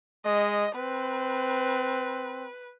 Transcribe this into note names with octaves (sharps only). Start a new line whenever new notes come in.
G#3 D#5
C4 B4